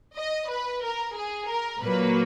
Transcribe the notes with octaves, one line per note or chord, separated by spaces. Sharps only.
D#5
B4
A#4
G#4
A#4
A#2 F#3 A#3 B4